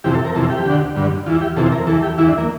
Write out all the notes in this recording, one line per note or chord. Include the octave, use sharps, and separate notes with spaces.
F2 C3 E3 G4
A4
A#4
F2 C3 E3 A4
G4
D2 D3
G2 D3
E2 E3 F4
G4
F2 C3 E3 A4
A#4
E2 E3 A4
G4
E2 E3 E4
D4
A#3